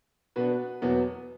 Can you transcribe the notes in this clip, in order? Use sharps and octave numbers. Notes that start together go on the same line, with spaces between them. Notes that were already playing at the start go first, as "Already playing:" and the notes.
B2 B3 D4 F#4 B4
E2 B2 F#3 B3